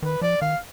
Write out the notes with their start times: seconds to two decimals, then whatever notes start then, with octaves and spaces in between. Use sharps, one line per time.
0.02 D#3 B4
0.22 F3 D5
0.41 D#3 F5